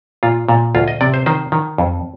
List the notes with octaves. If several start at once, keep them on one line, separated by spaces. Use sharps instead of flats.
A#2 F4
A#2
D2 F4
D#5
C3 D5
C5
D#3 C5
D#3
F2